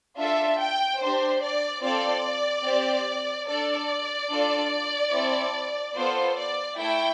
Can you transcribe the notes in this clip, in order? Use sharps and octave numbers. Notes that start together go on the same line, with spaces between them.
D4 F4 A4 E5
G5
D4 G4 C5
D5
C4 F4 A4 D5
C4 G4
D4 A4 D5
D4 F4 A4
C4 E4 A4
B3 F4 A4 C5
D5
A3 E4 A4 G5